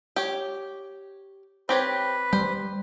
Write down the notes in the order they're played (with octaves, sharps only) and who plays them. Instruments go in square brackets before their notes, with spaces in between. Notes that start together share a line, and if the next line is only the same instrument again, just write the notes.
[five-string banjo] G4 C#5
[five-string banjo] C4 G4 C#5 [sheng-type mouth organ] B4
[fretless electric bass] G3 [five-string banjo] C5